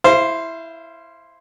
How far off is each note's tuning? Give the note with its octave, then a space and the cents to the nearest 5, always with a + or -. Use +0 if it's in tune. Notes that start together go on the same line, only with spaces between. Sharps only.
E4 +0 C5 +0 F5 -25